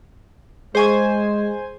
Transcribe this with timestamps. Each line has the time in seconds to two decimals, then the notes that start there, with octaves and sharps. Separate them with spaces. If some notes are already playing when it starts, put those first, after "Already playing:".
0.75 G#3 G#4 C5 G#5 C#6